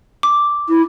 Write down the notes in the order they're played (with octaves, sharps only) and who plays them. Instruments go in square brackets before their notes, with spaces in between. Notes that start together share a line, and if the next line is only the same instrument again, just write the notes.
[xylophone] D6
[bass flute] E4